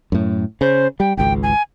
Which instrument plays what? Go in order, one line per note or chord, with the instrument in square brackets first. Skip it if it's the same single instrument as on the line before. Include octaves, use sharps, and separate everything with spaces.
[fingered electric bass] F#2 A2
[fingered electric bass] C#3 [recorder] C5
[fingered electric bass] G3 [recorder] G5
[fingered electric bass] G#1 C#2 [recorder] G5
[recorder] G#5